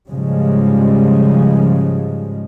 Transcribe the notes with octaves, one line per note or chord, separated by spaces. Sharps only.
G#2 C#3 F3 G3 G#3